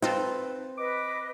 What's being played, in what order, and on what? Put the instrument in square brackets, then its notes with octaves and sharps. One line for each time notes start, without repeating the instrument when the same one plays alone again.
[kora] C4 [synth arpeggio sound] D#4 F4 A4 [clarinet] B4
[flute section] B4 D#5 [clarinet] D6